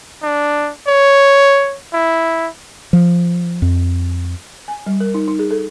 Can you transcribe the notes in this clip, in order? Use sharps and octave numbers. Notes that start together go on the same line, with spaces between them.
D4
C#5
E4
F3
F2
G#5
G3
A#4
D#4
D#4
G#4
A4